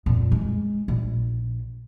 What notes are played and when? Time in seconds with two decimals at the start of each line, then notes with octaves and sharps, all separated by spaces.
0.06 F2 A#2
0.31 G#3
0.88 A#1